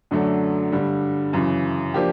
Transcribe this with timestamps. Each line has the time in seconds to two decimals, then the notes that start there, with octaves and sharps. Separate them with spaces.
0.11 F#2 D3 F#3 A3 D4
0.72 G2 D3 G3
1.33 F#2 C#3 E3
1.94 F3 A#3 D4 G4